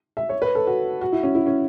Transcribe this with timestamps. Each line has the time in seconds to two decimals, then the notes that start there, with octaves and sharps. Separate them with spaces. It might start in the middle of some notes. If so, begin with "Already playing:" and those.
0.17 E5
0.29 C#5
0.42 B4
0.55 A4
0.67 F#4
1.01 F#4
1.12 E4
1.23 C#4
1.35 E4
1.46 C#4